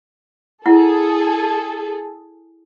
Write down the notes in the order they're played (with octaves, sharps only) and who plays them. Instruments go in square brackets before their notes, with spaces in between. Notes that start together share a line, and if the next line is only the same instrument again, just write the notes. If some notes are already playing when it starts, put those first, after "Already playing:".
[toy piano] E4 F#5 [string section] G#4 A4